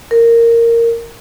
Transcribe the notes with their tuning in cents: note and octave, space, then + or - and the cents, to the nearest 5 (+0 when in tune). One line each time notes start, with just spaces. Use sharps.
A#4 -10